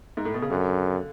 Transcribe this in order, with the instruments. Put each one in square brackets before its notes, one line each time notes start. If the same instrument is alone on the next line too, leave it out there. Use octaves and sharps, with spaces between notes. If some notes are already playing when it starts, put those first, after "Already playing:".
[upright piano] G#2
A2
B2
C#3
[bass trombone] F#2 [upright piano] D3